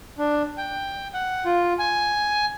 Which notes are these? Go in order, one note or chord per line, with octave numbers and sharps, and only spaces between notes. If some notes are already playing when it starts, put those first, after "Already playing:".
D4
G5
F#5
F4
G#5